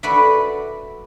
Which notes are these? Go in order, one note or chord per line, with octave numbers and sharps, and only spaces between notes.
F#4 A4 B4 D5 E5